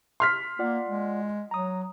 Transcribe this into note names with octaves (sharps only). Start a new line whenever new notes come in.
C6 F6 B6
A#3 F4 D5 F#5
G#3
F#3 A#5 D#6